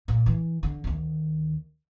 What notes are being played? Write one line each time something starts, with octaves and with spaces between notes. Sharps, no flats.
A#2
E3
D3
D2 D#3